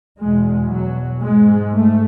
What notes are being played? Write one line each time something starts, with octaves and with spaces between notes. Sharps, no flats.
E2 B2 G#3
F#3
G#2 G#3
A3